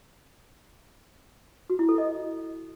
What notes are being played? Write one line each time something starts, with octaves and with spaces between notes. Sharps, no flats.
F#4
E4
A4
D#5